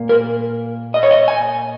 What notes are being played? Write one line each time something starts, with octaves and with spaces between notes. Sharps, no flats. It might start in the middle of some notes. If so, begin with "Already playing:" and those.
Already playing: A#2 A#3
A#4
D#5
C#5
D#5
G#5